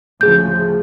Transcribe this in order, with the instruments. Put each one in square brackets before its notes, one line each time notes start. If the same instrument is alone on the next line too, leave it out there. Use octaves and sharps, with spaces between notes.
[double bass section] D2 C#3 F3 [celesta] G#4 G6